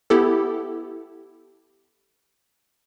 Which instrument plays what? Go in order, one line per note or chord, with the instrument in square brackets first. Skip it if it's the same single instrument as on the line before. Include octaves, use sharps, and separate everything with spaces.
[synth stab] B3 E4 G4 A4